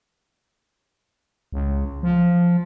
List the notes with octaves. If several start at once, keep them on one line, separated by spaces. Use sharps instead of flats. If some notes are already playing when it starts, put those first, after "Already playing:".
C#2
F3